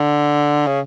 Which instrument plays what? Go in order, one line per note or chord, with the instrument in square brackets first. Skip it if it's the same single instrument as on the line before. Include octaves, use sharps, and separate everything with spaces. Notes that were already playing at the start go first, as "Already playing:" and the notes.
Already playing: [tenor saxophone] D3
C#3